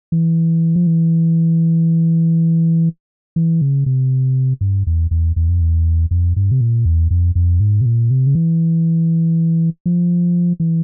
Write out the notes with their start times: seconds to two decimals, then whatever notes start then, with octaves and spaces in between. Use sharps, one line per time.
0.12 E3
0.76 F3
0.87 E3
3.36 E3
3.61 C#3
3.86 C3
4.61 G2
4.87 E2
5.11 E2
5.36 E2
5.49 F2
5.61 E2
6.11 F2
6.36 G2
6.51 C3
6.61 A#2
6.85 E2
7.11 F2
7.35 F2
7.60 G#2
7.81 C3
7.86 A#2
8.11 C3
8.27 C#3
8.35 E3
9.86 F3
10.60 E3